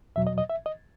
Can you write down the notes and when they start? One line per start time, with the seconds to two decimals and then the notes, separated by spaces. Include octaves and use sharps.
0.16 E2 B2 F#3 E5
0.27 D#5
0.38 D#5
0.49 E5
0.66 D#5